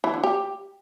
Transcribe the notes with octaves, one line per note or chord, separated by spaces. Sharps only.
E3
D3
G4